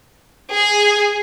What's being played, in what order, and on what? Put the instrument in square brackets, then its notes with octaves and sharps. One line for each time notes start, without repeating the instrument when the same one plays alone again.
[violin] G#4